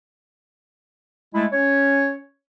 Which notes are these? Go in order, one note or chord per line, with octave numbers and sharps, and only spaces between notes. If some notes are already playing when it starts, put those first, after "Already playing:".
G#3 A3 E4
C#4 C#5